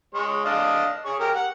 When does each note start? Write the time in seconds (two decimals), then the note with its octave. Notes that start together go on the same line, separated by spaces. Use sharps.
0.14 G#3 C#5
0.45 D4 D#5 F5
1.05 G#4 C#5
1.20 G4 A#4
1.35 F#5